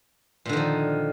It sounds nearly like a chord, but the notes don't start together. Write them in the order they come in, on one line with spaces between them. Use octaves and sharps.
A#2 D3 D#3 F3